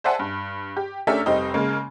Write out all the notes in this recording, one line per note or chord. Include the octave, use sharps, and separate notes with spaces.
C5 D5 E5 F#5 G#5 A5
G2
G4
A3 C#4 D4 G4 A#4 E5
F1 G3 C4 D#4 D#5
C#3 G#3 A#3